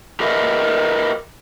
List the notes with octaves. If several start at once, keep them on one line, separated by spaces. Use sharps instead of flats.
G4 A#4 B4 D#5 E5